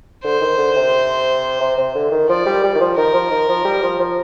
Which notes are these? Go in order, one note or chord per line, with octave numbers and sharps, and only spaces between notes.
D3 C5
D#3
D3
C3
C3
C3
D3
D#3
F3 D5
G3
G3
D#3
F3
D#3 A#4
F3
D#3
F3
G3
F3
F3